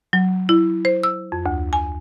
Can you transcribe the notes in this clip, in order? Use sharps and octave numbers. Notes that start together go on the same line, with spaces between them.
F#3
E4
C5
E6
F2
D2
G#5